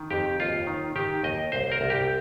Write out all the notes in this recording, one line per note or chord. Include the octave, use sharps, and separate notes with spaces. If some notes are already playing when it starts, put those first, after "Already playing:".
Already playing: D#3
F2 G4
D#2 F4
D#3
D#3 G4
D#2 D#5
C2 C5
A#4
C2
G4